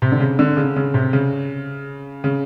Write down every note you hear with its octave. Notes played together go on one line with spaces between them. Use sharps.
C3
D3
C#3
D3
C#3
C#3
C3
C#3
C#3